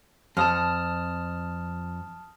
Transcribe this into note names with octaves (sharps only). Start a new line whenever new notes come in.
F2 A5 D#6 F6